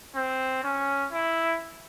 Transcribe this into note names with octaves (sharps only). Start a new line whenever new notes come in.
C4
C#4
E4